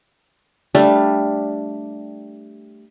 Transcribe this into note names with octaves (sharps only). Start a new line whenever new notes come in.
G3 A3 D4 F5